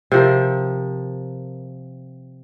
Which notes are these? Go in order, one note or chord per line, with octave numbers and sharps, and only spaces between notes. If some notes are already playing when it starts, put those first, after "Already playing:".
C3 F3 A#4